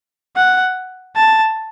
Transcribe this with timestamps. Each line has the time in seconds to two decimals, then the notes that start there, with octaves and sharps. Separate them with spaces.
0.36 F#5
1.16 A5